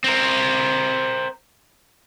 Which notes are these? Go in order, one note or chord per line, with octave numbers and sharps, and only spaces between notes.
C4 A#4